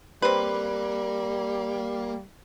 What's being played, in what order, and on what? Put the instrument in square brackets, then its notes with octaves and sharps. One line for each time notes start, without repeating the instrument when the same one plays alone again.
[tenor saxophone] G3 [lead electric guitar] A#3 [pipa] C4 B4